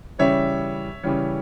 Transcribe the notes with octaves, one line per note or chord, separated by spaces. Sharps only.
C#3 E3 G3 C#4 C#5 E5
C#3 E3 G3 C#4